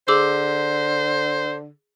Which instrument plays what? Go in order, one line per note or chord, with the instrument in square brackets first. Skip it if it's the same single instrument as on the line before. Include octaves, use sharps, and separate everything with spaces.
[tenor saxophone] D3 [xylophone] G#4 D6 E6 [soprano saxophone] C5